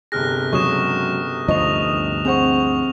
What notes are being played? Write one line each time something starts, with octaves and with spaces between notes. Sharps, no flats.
G1 C3 G#4 F6 F#6 A#6
C#3 F#3 G#3 C#6 D#6 E7
D2 G2 F3 D#5 C#6 F7
C4 G#4 C5 F#5 C#6 F7